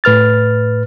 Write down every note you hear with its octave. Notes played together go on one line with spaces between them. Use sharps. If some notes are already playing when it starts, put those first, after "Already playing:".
A2 B4 F6 A6